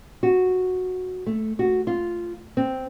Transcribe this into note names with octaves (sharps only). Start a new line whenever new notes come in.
F#4
A3
F#4
F4
C4